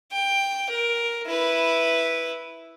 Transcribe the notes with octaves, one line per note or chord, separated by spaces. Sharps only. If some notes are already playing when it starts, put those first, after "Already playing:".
G5
A#4
E4 B4